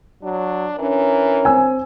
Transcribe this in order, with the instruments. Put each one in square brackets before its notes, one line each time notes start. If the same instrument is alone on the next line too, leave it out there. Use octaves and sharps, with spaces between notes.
[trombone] F#3 [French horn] D4
[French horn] E3 [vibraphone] C#4 D4 C#5 [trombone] A#4
[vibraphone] C4 C5 [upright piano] G#5 E6